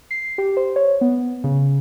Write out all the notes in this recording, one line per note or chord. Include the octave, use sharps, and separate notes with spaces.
C7
G4
C5
C#5
B3
C#3